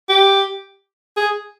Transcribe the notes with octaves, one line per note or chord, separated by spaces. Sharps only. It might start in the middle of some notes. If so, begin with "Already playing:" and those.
G4
G#4